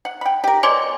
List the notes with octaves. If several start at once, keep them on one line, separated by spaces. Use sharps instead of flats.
F#5
G5 B5
G4 A#4
B2 C#5 D5 G#5 C6 D6